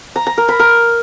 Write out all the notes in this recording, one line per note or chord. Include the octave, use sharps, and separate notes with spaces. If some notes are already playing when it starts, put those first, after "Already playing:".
A#5
A#5
A#4
B5
A#4